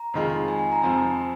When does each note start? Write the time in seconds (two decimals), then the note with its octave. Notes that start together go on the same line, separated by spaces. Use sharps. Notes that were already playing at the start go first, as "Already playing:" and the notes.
Already playing: A#5
0.14 F2 D#3 G#3 F4
0.48 G#5
0.59 G#5
0.72 A#5
0.82 F2 F3 C4 G#5